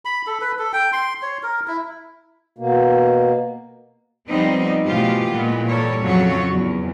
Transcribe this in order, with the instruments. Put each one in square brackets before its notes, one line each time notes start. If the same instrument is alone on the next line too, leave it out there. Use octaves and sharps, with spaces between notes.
[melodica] B5
A4
B4
A4
G5
C6
C#5
A#4
E4
[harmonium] B2 A#3
[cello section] F3 G3 B3 C4 D#4
B2 E3 F3 A3 F4 G4
A#2 E3 G#3 B3
G3 A4 A#4 C#5
F2 C#3 F#3 F#4 A4 C#5
E2